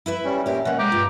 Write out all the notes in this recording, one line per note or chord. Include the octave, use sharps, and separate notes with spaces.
E4 B4 E5
G3 C#4
A#2 C#4 G4 A#4 E5
B2 A#3 C#4 E5 F#5
G#3 G4 A#5 D6
G2 F4